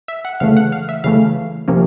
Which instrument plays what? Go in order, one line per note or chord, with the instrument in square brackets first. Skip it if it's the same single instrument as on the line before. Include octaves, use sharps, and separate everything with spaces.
[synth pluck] E5
F#5
C#3 E3 A3 F5
F#5
F5
E5
C#3 E3 A3 F5
C3 F3 A#3 C#4